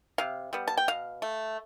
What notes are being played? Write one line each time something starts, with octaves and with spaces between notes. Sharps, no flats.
C3 F5
G3 B3
A5
G5
B2 F5
A3